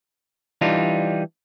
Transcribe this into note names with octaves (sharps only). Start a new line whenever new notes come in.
E3 G3 D4 D#4 F4